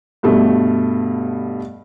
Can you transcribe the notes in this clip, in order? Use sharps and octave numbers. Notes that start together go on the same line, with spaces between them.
G2 B2 A3